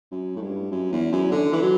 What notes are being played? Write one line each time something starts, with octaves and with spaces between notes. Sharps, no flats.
F#2
A2
G2
F#2
E2
F#2
D3
E3
F#3